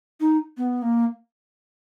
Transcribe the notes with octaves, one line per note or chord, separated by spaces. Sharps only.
D#4
B3
A#3